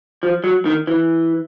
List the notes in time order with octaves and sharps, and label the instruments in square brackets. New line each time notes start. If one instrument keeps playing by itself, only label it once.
[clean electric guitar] F3
F#3
D#3
E3